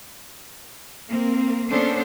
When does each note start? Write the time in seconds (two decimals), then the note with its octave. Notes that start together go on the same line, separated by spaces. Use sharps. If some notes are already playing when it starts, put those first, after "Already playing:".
1.08 A#3 C4
1.70 A#3 B3 C#4 D4 A4 C5